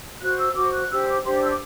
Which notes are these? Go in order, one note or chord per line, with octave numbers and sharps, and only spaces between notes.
F#4 C5 F#6
E6
F#4 C5 D6
F#6
D4 G4 C5 E6
D6
D4 G4 C5 C6
D6
E6
D6